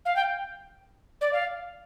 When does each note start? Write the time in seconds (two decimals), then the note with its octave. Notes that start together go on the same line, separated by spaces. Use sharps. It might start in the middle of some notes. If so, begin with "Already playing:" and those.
0.05 F5
0.16 G5
1.21 D5
1.33 F5